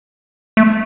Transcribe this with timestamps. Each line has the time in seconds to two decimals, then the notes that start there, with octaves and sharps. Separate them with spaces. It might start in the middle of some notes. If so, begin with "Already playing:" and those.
0.57 A3